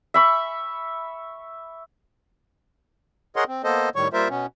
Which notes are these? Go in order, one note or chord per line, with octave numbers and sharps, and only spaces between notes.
E5 B5 C#6
G#4 A#4 C#5 D#5 F#5 C6
C4
A#3 B3 A4 C5 D#5
A2 D#3 G3 C#5 C#6
G3 A#3 F4 A#4 C5 E5
B2 B3 C#4